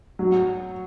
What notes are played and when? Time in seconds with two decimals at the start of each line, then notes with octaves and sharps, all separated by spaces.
0.19 F#3